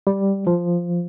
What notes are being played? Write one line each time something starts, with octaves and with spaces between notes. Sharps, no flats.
G3
F3